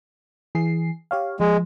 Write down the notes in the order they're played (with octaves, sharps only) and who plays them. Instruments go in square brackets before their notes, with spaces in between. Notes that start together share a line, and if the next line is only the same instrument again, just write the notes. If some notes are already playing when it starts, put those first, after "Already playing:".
[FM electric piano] E3 G#4 C7
G4 C#5 F5
[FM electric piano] F3 [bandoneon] G#3